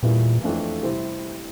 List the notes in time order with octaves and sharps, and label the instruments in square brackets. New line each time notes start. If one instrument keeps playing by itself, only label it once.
[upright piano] E2 E3 G3 A#3 E4 [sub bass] A#2
[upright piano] F2 E3 A3 D4 F4
C3 G3 C4 E4